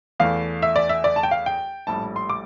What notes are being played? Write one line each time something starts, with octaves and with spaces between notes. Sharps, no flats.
E2 E3 A3 F5
E5
D5
E5
D5
A5
G5
F5
G5
A#1 A2 G3 A5
C6
D6